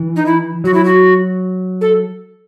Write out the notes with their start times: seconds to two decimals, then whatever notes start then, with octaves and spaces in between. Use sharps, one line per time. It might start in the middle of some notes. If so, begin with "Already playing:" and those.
Already playing: E3
0.16 D#4
0.26 E4
0.64 F#3 F#4
0.74 E4
0.85 F#4
1.81 A4